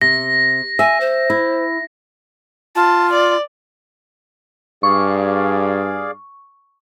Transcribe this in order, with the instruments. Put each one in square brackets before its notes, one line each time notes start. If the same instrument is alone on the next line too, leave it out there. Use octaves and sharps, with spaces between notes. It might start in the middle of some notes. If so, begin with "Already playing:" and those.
[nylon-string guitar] C3 [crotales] A#6
[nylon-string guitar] E5 [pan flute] G#5
[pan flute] C5
[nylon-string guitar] E4
[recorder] F4 [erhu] A5
[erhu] D5
[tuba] G2 [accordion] G#4 D5 F5 [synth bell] C#6